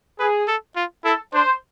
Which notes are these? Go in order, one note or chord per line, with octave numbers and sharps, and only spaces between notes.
G#4 B4
A4
F4
E4 A4
D4 C5